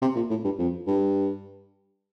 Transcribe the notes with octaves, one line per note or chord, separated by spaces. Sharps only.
C3
A#2
A2
G2
F2
G2